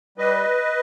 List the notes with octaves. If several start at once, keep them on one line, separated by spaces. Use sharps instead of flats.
G3 B4 D#5